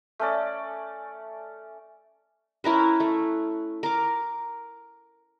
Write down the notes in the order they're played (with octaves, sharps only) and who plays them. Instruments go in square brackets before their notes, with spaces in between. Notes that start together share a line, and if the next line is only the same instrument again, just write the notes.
[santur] A3 C#4 D5
[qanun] C#4 E4 A#4 B4
A3
A#4 D6